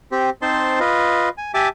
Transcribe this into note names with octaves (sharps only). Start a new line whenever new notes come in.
C4 G4
C4 D#4 C5 A5 C6
F4 B4 D#5
G#5
G4 E5 G#5 A5 D6